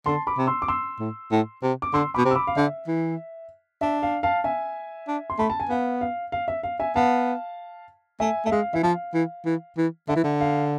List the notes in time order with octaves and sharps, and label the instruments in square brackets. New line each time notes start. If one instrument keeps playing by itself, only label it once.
[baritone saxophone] D3 [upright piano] A5 C6
[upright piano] B5 D6
[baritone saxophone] C3
[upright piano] C6 E6
D6
C6 E6
[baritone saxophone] A2
A2
C3
[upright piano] D6
[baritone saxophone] D3 [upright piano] C6 E6
[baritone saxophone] B2 [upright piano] B5 D6
[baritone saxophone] C3
[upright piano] E6
B5 D6
F5
[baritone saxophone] D3 [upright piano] E5
[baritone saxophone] E3
[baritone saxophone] D4 [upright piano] E5
[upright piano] F5
F5 A5
E5 G#5
[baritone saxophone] D4
[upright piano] C6
[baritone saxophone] A3 [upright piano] B5
[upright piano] A5
G#5
[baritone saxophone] B3 [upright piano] F5
[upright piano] F5
F5
E5
F5
E5 G#5
[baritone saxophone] B3 [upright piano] F5 A5
[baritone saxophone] A3 [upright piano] E5 G#5
[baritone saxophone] A3 [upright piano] E5
[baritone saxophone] G#3 [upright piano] F5
[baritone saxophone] E3 [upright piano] E5
[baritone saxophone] F3 [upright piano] F5
[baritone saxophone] E3
E3
E3
[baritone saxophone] D3 [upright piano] E5
[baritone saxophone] E3
D3
[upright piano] F5